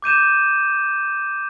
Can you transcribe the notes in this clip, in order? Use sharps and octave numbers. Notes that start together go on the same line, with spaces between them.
D6 G6 D#7 E7